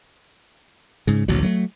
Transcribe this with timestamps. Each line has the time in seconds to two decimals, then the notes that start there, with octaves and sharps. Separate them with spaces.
1.07 G#2 C#3
1.28 A1 D2 B2 F#3
1.43 F#3 G#3 A3